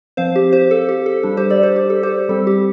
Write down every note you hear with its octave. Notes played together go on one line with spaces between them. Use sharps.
F3 C4 C5 F5
G4
G4 C5
A4
G4
A4
G3 D4 A4
G4 C5
A4 D5
G4 C5
G4
A4
G4 C5
G3 C4 A4
G4